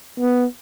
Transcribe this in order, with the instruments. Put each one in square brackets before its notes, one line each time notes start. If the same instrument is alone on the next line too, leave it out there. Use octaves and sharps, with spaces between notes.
[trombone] B3